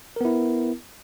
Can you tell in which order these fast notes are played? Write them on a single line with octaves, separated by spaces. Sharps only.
A#4 B3 E4